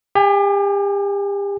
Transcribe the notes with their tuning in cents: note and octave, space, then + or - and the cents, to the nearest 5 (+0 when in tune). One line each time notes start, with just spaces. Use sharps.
G4 +35 G#5 +0